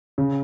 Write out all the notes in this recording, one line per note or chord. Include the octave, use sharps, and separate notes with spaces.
C#3